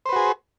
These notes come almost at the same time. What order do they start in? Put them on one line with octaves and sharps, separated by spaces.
C5 B4 F#4 G#4